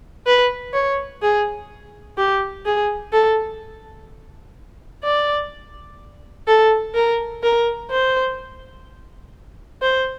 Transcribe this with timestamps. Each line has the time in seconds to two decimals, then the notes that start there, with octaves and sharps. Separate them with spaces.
0.26 B4
0.73 C#5
1.22 G#4
2.18 G4
2.66 G#4
3.13 A4
5.04 D5
6.48 A4
6.95 A#4
7.43 A#4
7.91 C5
9.82 C5